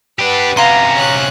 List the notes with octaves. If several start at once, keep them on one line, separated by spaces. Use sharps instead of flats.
D4 G4 B4 F#5
C3 C#4 F5 A#5 C6
C#5 F#6